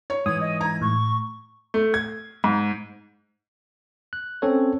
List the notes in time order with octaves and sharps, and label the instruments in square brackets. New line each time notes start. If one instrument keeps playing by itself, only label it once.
[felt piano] C#5
[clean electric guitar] G#2 E3 [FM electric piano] D#6 [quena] G#6
[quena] D#5
[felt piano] A#5 [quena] G#6
[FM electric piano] A2 [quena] C#6
[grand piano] A3
G#6
G#2
[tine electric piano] F#6
C4 C#4 A4 C#5